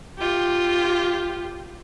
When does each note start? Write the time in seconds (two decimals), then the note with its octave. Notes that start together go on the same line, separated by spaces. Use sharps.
0.19 F4 G4